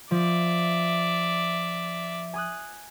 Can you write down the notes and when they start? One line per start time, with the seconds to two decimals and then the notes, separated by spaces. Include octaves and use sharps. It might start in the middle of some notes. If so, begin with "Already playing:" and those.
0.11 F3 D5 E5
2.34 G#5 D#6 F#6